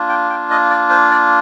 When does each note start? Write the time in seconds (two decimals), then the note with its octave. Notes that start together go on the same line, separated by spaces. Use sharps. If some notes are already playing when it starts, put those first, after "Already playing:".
Already playing: A#3 D4 F4
0.09 G5
0.30 G5
0.51 D#5
0.70 D5
0.90 C5
1.11 D5